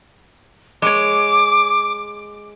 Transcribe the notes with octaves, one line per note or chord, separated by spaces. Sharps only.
G#3 C#5 D6